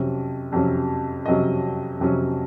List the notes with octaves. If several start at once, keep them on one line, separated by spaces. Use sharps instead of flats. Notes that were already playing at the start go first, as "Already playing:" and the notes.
Already playing: F2 C3 F#3 C#4
F2 C3 F#3 C#4
F2 C3 F#3 C#4 D#5
F2 C3 F#3 C#4